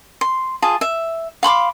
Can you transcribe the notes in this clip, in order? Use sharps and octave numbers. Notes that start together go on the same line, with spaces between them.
C6
F4 G#4 A5
E5
F5 B5 C6 D6